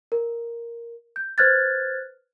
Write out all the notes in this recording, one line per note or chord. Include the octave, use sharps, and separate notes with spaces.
A#4
G6
B4 C5 F6 F#6 G#6 A6